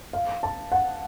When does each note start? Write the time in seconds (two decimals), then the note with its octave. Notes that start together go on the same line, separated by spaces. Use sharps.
0.13 F5
0.43 A5
0.72 F#5